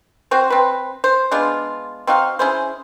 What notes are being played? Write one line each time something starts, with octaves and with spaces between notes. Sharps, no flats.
C4 F#4 C5
C4 B4
C5
G#3 B3 D4 F4
C4 D#4 F#4 F5
C#4 E4 G#4 C5